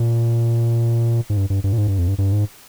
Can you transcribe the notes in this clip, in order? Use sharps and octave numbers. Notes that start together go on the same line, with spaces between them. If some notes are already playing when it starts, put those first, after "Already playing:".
Already playing: A#2
G#2
G2
G2
G2
A#2
G#2
G2
F2
G2
G2
G#2